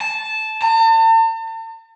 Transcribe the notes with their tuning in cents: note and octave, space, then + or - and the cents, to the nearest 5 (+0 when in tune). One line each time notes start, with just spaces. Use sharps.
A5 -10
A5 +45